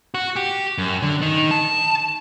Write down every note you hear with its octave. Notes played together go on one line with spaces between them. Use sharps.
F#4
G4
F#2
D3
D#3
A5